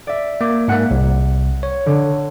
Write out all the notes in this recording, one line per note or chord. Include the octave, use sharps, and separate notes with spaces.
D5 E5
A#3 D6 G#6
G#2 A#3 E5 F#5 F#6
C2
C#5
D3